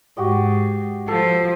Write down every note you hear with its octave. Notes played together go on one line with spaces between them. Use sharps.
G#2 F#4 G4 D#5
F3 A4